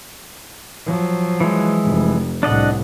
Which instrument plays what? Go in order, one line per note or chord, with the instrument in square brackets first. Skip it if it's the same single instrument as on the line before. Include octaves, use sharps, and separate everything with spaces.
[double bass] F3 F#3
[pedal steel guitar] E3 G#3
[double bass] F1
[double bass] C2 A2 [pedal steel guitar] D4 D#5 F#5